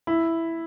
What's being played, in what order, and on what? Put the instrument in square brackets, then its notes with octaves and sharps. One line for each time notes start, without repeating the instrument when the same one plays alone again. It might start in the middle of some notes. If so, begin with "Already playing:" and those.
[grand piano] E4